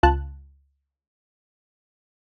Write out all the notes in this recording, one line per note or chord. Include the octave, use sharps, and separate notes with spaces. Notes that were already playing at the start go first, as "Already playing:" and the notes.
C#2 F4 A5 F#6